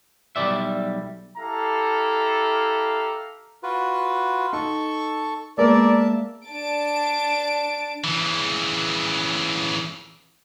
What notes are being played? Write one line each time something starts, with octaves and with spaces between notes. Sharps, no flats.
B1 F#2 G3 D5 E5
E4 G4 A4 F5 A#5
F4 F#4 B4
D#4 A4 C#6
G#3 A#3 B3 A#4 D5 E5 A5
D4 A5 D7
C#3 E3